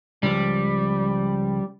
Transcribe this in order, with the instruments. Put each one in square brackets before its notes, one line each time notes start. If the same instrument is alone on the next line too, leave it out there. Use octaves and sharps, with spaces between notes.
[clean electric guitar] C#2 F3 [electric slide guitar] G3